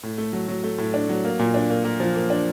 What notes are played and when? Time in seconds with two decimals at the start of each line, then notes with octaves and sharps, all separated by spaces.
0.03 A2
0.18 A3
0.33 F#3
0.48 F#3
0.64 A3
0.78 A2
0.94 D4
1.09 F#3
1.25 A#3
1.39 A#2
1.54 D4
1.70 A#3
1.85 A#3
2.00 F3
2.15 A#3
2.30 D4